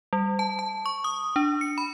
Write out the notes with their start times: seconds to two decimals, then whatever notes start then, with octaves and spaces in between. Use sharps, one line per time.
0.13 G3
0.39 A5
0.59 A5
0.86 C#6
1.04 D#6
1.36 D4
1.61 C#7
1.78 B5